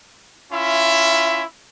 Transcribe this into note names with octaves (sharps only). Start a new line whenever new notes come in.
C#4 E4 F4 E5